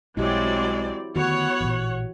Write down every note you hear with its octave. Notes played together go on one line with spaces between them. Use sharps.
B1 F#3 G#3 C4 E4 G4 D5
D3 D#3 A3 B3 F#4 C#5 F#5
A1 A#2 E3